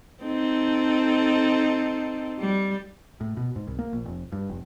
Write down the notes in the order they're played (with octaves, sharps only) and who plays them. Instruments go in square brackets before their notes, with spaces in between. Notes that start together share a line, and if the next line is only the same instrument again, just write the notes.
[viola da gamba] C4 D#4 A4
G3
[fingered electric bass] A2
B2
G#2
C2
A#3
A#1
F1
G2
F1